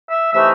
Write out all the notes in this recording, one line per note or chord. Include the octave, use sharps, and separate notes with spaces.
E5
C3 E3 A3 D#4 E5